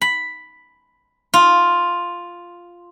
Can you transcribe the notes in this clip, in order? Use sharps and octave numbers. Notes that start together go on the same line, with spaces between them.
B5
F4